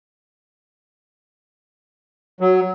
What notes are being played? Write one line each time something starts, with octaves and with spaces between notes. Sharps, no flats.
F#3